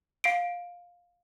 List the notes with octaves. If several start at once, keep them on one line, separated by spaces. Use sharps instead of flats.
F5 C7 D7